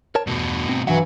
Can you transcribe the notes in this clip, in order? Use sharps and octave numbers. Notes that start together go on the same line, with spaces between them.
A#4 C#5 A5
E2 G2 B2
C4
B1 G2 E3 F#3 E5 F#5